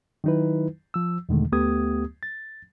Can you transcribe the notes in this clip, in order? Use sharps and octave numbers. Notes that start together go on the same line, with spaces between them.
D#3 F#3 D#4 E4 B4
F3 E6
E2 B2 D3 D#3 G#3 A3
D2 A3 B3 G4 D#6 G#6
A6